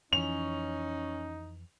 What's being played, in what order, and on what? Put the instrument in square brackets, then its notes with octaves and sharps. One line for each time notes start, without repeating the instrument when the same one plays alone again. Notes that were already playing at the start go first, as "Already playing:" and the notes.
[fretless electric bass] F2 E3 [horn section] C#4 [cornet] D#4 [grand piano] F7